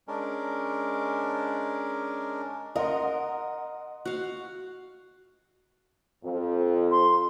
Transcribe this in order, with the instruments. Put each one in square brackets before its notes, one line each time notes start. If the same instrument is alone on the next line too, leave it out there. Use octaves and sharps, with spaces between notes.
[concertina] G#3 C#4 D4 A#4
[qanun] A#4 [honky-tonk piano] D#5 F#5 C6
[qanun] F#4 F5
[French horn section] F2
[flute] C6